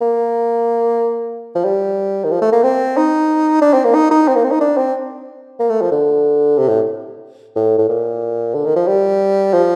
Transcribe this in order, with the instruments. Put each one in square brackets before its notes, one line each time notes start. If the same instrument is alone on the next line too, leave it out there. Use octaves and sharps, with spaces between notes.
[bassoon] A#3
F3
G3
D#3
F3
A3
A#3
C4
D#4
D4
C4
A#3
D#4
D#4
C4
A#3
C4
D#4
D4
C4
A#3
A3
F3
D3
C3
A2
A2
A2
A#2
D3
D#3
F3
G3
F3